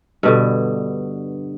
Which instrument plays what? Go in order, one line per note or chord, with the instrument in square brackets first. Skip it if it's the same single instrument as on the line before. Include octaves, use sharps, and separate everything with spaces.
[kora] G2 B2 D3